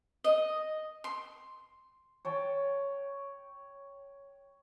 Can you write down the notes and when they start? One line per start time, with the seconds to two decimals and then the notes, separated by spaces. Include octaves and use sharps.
0.24 D#5
1.04 C6
2.25 C#5 G5 A5